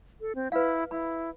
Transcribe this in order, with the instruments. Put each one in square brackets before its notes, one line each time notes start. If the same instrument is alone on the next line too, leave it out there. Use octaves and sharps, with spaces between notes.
[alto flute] A4
C4
[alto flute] E4 [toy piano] B4 F5
[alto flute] E4 [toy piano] B5